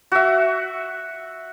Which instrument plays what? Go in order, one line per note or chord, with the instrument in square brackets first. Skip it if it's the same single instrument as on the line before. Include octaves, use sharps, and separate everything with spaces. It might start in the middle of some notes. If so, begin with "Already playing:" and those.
[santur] F#4 E5